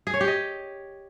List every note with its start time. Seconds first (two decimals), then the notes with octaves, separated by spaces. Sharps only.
0.07 G#4
0.14 C#5
0.21 G4
0.28 D#5